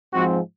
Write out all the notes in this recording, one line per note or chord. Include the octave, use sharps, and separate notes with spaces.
G#2 F3 G#3 C4 F#4